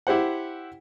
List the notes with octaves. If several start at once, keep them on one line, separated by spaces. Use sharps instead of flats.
E4 G4 C5 F#5